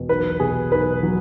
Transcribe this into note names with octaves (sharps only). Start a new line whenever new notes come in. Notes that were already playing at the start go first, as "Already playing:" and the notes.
Already playing: E1 B2
B1 B4
B2 G#4
B1 B4
F#3